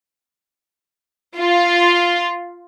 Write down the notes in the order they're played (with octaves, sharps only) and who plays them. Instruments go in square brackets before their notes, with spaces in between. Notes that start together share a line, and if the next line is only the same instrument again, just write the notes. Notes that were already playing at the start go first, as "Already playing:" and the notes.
[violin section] F4